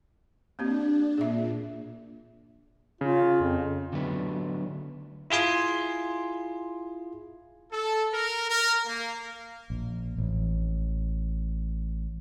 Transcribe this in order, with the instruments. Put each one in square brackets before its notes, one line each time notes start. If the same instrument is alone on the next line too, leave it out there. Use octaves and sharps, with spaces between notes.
[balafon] A#3 C4 G4 [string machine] D4
[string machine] A#2 [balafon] G#4 E5
[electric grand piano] C#3 [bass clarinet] F4
[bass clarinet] F2
[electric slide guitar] D3 F#3 A3 B3
[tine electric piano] E4 F4 G#4 G#5 C6
[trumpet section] A4
A#4
A#4
A#3
[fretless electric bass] A#1
A1